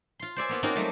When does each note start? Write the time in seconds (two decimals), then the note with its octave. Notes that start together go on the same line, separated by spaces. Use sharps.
0.19 F4 C6
0.36 C5 D5 E5 G#5
0.49 A#3 B3 F4
0.63 A#3 C4 C#4 D#4 F4 F#4
0.75 F#3 G3 A3 C#4 D#4